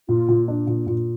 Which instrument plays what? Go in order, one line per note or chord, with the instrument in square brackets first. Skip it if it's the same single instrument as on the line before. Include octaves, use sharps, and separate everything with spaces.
[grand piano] A#2 [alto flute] F4
[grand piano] A#2
D4
A#2
A#2